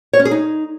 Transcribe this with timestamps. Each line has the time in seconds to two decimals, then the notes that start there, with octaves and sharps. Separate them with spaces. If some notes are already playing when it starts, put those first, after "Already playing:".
0.13 C#5
0.19 C#4
0.25 G#4
0.31 D#4